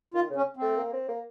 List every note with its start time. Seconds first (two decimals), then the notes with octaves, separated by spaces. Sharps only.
0.14 D#3 F4
0.30 C#3
0.36 C#4
0.57 A3 C4
0.77 A#3
0.93 C4
1.08 A#3